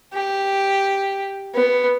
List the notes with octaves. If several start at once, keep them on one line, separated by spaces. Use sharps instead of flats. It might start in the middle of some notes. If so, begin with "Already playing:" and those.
G4
B3